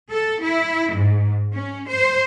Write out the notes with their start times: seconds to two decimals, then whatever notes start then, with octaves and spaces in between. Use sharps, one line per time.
0.12 A4
0.43 E4
0.95 G#2
1.53 C#4
1.89 C5